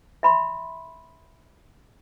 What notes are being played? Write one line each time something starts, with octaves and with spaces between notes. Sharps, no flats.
E5 B5 C6